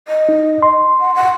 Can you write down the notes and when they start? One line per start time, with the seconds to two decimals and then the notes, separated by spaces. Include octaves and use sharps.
0.08 D#5
0.29 D#4
0.62 C6
1.00 F#5
1.15 F#5